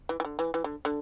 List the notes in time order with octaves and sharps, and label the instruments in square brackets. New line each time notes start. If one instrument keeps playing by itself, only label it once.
[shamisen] E3
E3
D3
E3
E3
D3
D3